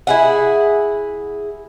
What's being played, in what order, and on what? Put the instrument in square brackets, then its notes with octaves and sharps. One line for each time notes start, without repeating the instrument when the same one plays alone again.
[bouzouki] E4 G#4 F#5